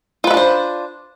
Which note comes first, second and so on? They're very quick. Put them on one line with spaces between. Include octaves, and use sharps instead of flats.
F4 B4 E5 D4 C5